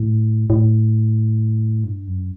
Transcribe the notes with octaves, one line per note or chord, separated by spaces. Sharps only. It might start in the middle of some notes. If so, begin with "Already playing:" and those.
Already playing: A2
A2
G2
F#2